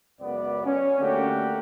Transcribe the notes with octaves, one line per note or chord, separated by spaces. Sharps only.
C#2 F#2 B3 D5
C#4
D3 A3 A#3 F#4 G4